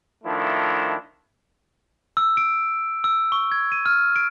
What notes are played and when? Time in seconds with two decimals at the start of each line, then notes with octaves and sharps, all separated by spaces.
0.24 D#3 F3 A3 D4 E4
2.17 E6
2.37 D7
3.04 E6
3.32 C#6
3.52 G#6
3.72 D#7
3.86 F6
4.16 D7